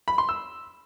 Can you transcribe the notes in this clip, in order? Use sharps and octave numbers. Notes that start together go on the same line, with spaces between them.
B5
C6
E6